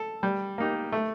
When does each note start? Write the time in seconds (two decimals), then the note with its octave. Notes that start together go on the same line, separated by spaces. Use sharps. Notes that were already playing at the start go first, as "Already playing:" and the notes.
Already playing: A4
0.23 G3
0.58 A#3 D#4 G4
0.92 A3